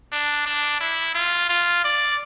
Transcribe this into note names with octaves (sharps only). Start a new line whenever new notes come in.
D4
D4
E4
F4
F4
D5